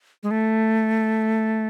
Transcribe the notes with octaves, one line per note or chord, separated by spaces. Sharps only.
G#3
A3